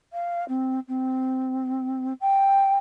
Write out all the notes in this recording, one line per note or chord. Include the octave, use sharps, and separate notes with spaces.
F5
C4
C4
G5